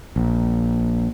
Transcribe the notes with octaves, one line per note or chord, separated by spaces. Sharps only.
A#1